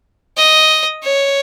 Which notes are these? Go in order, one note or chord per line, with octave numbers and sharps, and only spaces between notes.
D#5
C#5